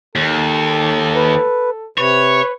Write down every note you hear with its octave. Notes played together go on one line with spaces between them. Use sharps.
D#2 A4
B4
C3 B4 C#5